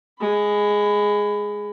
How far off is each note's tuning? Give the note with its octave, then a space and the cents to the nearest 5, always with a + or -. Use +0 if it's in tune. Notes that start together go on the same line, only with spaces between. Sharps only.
G#3 +0 B5 +20